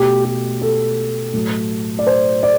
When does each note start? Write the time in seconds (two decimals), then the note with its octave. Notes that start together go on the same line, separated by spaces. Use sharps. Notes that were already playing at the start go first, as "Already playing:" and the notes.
Already playing: B2 A3 G4
0.25 G4
0.61 A4
1.33 A2 F#3 A3
1.99 D5
2.07 C5
2.43 D5